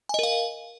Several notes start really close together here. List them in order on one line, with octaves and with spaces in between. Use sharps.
G#5 D#5 A#4 F5